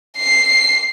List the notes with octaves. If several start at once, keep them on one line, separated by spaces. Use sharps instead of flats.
C7